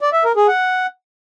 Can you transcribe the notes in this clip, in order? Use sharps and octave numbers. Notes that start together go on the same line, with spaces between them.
D5
E5
A#4
G#4
F#5